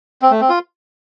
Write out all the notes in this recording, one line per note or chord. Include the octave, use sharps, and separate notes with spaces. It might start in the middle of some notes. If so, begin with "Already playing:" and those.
C4
A3
C4
F4